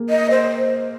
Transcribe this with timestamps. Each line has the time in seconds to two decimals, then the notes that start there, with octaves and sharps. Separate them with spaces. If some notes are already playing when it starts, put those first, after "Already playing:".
Already playing: A#3 G#4
0.10 D#5
0.30 C5